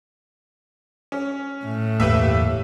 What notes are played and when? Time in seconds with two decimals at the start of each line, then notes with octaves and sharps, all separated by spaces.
1.12 C#4
1.65 A2
2.00 G1 E2 A#3 G4 B4 E5